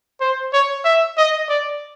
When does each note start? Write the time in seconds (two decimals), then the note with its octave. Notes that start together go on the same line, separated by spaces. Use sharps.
0.21 C5
0.53 C#5
0.85 E5
1.18 D#5
1.49 D5